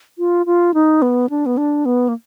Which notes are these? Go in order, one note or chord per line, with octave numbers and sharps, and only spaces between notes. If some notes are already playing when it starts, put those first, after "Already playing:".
F4
F4
D#4
B3
D4
B3
D4
B3
A#3